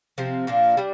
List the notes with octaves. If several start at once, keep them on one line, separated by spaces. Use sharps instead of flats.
C3 F3 C4
A#2 F3 A#3 D4
G3 D4